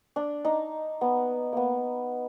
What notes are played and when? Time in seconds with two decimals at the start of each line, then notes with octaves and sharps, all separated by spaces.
0.16 D4
0.45 D#4
1.01 B3
1.53 A#3 B3